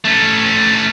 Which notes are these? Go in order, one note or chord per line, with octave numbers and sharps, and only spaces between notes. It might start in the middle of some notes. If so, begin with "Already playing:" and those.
A3 C#4